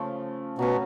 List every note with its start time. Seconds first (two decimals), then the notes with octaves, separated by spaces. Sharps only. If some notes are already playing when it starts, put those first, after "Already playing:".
Already playing: C#3 F3 A3
0.58 B2 F#3 A3 C#4